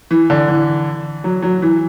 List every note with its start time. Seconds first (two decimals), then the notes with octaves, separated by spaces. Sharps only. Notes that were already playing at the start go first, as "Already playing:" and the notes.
0.11 E3
0.30 D3
0.48 E3
1.24 F#3
1.42 F#3
1.62 E3